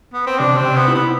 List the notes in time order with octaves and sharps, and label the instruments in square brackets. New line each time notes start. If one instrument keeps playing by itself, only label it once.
[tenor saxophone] B3
C4
[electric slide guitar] C3 [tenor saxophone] D4
[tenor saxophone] C4
[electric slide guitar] C3
[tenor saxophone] B3
[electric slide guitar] E4
[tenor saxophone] B3